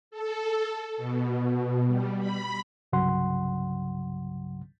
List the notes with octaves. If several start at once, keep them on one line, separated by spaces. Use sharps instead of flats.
A4
B2
G3
B5
C2 G2 C#3 F#3 F#5 C6